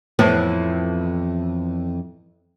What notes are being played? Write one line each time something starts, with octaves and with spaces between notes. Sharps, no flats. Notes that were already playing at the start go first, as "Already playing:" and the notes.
F2 A2 E3 B3 C5